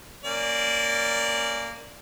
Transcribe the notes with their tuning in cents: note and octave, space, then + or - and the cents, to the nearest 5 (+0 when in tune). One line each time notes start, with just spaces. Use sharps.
A#3 -10 C#4 +0 D5 +0